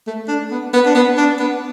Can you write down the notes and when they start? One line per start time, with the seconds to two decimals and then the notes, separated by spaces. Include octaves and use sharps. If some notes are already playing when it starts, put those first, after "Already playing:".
0.07 A3
0.28 D4
0.51 B3
0.73 B3
0.86 D4
0.95 B3
1.17 D4
1.39 B3